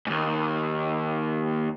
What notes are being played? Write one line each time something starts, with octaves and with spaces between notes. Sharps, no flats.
D#2 G#2